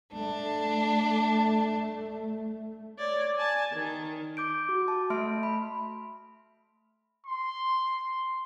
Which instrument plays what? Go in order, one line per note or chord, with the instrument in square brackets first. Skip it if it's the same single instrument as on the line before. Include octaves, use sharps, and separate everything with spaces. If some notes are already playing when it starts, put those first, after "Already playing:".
[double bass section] A3 [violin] D4
[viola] C#5 D5
G#5 A5
D#3
[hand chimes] D6 G6 D7
F#4
A5
A3 E5 C6 F6 D7
B5
[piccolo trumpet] C6